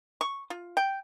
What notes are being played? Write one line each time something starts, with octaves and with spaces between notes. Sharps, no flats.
C#6
F4
G5